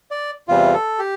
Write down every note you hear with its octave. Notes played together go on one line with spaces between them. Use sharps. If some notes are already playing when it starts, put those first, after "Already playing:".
D5
E2 C3 E3 G3 F4
A4
G4